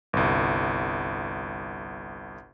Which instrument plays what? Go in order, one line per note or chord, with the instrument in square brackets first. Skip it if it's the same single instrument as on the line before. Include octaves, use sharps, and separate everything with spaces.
[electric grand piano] G1 C2